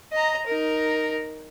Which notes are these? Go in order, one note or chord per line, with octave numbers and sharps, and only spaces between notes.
D#5 A#5
D#4 A#4